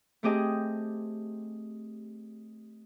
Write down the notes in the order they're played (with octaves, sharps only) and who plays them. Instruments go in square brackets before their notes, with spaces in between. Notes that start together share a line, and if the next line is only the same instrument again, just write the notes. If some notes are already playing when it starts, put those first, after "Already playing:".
[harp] A3 C4 G4 G#4 D#5